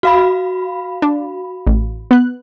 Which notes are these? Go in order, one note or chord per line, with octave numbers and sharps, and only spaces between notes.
F#4 F5 B5
D4
A1
B3 F#6